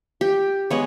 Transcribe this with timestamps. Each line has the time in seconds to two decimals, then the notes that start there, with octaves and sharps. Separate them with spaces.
0.21 G4
0.70 G#3 B3 C#5